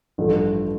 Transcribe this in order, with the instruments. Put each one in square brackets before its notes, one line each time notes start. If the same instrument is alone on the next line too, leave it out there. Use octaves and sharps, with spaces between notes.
[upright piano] A1 G2 F3 A3